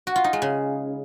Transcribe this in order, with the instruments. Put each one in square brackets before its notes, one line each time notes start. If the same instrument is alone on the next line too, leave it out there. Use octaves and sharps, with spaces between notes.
[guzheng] F#4
F4
D#4
G#3
C#3